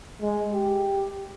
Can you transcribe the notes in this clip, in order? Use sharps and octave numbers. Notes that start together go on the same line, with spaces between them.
G#3
G4